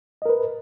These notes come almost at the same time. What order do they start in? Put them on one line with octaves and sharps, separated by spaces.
D#5 A#4 B4